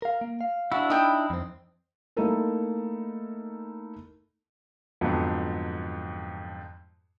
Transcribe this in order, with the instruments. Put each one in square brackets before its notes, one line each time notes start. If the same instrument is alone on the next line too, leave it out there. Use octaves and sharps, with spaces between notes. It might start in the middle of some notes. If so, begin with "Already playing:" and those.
[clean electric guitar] A#4 F5
A#3
F5
[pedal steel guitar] D4 E4 [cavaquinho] F#4
[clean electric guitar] D#4 [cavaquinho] G5 D#6
[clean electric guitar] F2 C4
[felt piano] A3 A#3 D#4 E4 A4 A#4
[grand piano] F2 G#2 D3 F#3 B3